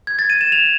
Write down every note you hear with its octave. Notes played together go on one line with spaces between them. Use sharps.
G#6
A6
D#7
E7
F7